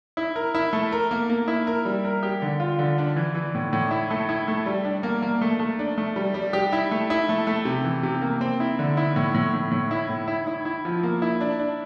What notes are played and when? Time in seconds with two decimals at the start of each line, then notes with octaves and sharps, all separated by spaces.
0.17 E4
0.36 A#4
0.55 E4
0.73 A3
0.92 A#4
1.11 A#3
1.30 A#3
1.48 E4
1.67 A#4
1.85 G3
2.05 A#4
2.23 G4
2.42 D3
2.60 F4
2.79 D3
2.98 D4
3.16 E3
3.35 E3
3.55 A2
3.73 A2
3.91 E4
4.10 A3
4.29 E4
4.48 A3
4.66 G3
4.84 D4
5.03 A#3
5.22 A#3
5.41 A3
5.60 A3
5.79 D4
5.98 A3
6.16 G3
6.34 G3
6.53 G4
6.73 E4
6.91 A3
7.10 E4
7.29 A3
7.47 A3
7.65 C3
7.84 E3
8.03 C3
8.21 A#3
8.41 C4
8.60 E4
8.79 D3
8.97 E4
9.16 A2
9.34 A2
9.53 A2
9.71 A2
9.91 E4
10.09 A2
10.28 E4
10.47 E4
10.65 E4
10.85 F3
11.03 A#3
11.22 E4
11.41 D4
11.59 D4